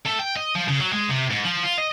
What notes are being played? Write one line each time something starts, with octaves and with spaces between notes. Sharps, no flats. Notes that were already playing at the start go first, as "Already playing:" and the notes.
A3
G5
D#5
F3
C#3
F#3
G#3
C3
G#2
F3
F4
D#5